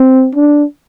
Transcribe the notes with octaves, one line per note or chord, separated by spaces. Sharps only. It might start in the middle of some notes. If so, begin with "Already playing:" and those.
Already playing: C4
D4